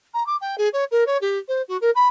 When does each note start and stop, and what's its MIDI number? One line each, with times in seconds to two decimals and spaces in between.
0.14 0.25 82
0.26 0.36 86
0.41 0.56 79
0.58 0.69 68
0.73 0.84 73
0.91 1.04 70
1.06 1.17 73
1.21 1.38 67
1.48 1.62 72
1.68 1.77 66
1.81 1.90 70
1.95 2.08 83